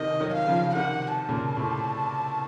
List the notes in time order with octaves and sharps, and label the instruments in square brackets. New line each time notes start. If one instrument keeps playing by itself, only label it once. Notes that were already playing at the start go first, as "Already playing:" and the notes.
Already playing: [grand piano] C3 D#3 [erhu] D#5
[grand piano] D#3 F#3
[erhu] F5
[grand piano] C#3 F3
[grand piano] C3 D#3 [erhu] F#5
[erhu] A5
[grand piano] A#2 C#3
A2 C3